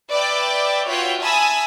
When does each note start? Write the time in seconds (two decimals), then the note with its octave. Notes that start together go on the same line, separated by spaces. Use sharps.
0.10 B4 D5 E5 G5 D6
0.88 F4 F#4 B4 C#5 E5 G5
1.22 E5 G#5 A5 B5 D#6 E6